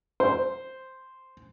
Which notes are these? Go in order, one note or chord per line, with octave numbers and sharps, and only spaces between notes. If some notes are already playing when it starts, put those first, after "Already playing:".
C5